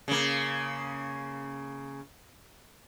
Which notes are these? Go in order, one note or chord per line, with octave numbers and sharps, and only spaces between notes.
C#3 A#3